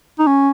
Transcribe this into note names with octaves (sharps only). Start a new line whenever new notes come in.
D#4
C#4